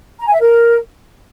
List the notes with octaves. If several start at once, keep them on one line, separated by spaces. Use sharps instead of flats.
A#5
G#5
E5
A#4